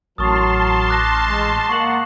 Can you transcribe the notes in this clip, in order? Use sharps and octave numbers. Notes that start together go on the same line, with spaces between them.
A1 F#3 A#4 A5 C6 C#6 D#6 F6
D6 F#6 A#6
G#3
A#3 F#5 C#6 F#7